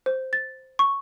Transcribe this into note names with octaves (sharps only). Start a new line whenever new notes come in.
C5
A6
C#6